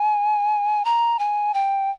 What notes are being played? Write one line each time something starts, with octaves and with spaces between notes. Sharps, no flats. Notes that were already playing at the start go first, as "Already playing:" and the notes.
Already playing: G#5
A#5
G#5
G5